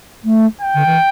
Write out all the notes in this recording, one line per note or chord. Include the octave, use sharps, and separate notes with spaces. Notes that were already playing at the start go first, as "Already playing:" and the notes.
A3
G5
D3
E3